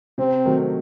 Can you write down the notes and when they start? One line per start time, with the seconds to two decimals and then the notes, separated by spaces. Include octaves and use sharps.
0.18 C3 C4
0.45 D#3 F#3 A3